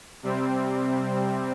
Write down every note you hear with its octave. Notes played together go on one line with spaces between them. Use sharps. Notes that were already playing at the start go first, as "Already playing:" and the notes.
C3 G3 C4